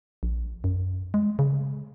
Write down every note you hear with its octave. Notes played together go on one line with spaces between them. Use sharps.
A#1
F#2
G#3
C#3